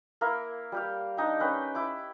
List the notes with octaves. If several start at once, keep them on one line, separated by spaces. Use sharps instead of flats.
A#3 E4 A#4
G3 G4 F5
D4 D#4 G4
C#4 B4 G5
E4 D6